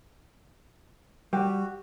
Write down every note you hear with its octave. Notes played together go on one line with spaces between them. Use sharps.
G3 F#4 G4